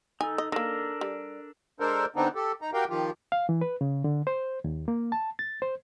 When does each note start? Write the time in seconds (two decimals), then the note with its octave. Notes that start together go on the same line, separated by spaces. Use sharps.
0.21 D#4 A4 G#5
0.38 D#5
0.52 A#3 D4 D#4 A4 A#4
1.01 G3
1.80 G#3 D4 A4 A#4 C5
2.16 D3 B3 C4 D4 D#4
2.35 G4 A4
2.62 D#4 A#5
2.74 F#4 G4 A#4 F5 G5
2.90 D#3 F3 F4 G4
3.32 F5
3.49 E3
3.61 B4
3.81 C#3
4.04 D3
4.27 C5
4.64 D#2
4.88 A#3
5.12 A5
5.39 A6
5.62 C5